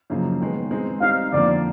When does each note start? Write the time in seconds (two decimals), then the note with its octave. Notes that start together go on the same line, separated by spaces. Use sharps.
0.10 F#2 C#3 F3 A#3 D#4
0.41 D#3 G#3 B3
0.71 G#3 C4 D#4
1.01 G3 C4 D#4 F5
1.32 F2 D3 F3 A#3 D5